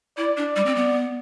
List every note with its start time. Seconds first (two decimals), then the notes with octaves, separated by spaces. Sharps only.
0.17 E4 D5
0.37 D4
0.56 G3 D5
0.66 C4
0.75 B3